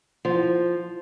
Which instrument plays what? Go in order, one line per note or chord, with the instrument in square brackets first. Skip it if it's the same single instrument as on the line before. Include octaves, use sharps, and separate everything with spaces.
[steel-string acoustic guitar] F3